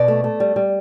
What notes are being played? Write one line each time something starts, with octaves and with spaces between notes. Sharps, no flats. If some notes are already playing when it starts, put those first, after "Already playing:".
Already playing: B2 D5
A3
A3
G3
G3